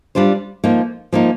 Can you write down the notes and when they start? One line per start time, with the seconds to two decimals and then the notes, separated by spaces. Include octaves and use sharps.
0.15 G3 D4 F4 C5
0.64 F3 A#3 D#4
1.12 F3 A#3 D#4